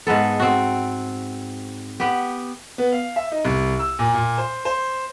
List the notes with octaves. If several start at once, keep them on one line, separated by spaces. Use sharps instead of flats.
G#2 G#3 B3 A4
C4 F#4
B3 G4
B3
F5
E5
D#4
C2
E6
A#2
A#2
C5
C5